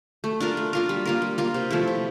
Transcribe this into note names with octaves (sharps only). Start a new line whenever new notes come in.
A3
D4 F4 A#4
A3
D4 F4 A#4
G3
A#3 F4 A#4
G3
A#3 F4 A#4
C3
F3 A3 E4
C3